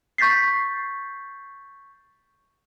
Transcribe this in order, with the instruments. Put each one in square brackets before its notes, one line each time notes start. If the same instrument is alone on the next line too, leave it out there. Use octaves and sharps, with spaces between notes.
[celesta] C#6 G6 A6 B6 C7